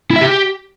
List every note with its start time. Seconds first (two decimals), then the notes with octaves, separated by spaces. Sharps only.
0.11 E4
0.16 E5
0.21 G4